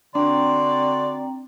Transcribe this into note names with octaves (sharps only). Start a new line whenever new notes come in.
D3 C4 D4 F#4 D5 G5 A#5 C6